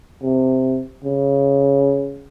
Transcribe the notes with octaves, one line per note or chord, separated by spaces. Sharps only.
C3
C#3